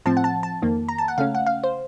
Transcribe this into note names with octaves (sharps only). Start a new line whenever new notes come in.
A2 F3 C4 A5
F#5
A5
A5
F2 D#3 A#3
A#5
A5
F#5
C#3 A3 C#4 F5
F#5
F5
C5